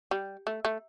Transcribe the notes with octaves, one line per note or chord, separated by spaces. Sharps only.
G3
A3
A3